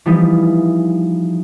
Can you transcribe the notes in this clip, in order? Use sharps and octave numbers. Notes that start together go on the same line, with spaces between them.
E3 F3 G3 B3 D#4